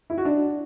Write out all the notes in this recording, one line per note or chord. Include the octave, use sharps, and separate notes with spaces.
E4
F#4
D4